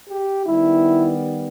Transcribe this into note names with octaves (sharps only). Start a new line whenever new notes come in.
G4
D#3 G3 B3 E4